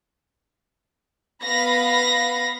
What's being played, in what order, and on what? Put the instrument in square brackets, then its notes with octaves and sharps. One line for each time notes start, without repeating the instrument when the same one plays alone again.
[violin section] B3 F5 B5 A#6